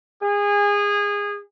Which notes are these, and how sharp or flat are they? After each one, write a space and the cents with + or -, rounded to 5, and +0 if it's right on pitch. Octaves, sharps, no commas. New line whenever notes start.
G#4 -25